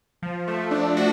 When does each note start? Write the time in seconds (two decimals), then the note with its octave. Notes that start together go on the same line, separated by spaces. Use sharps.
0.22 F3
0.47 A3
0.71 D4
0.97 F#4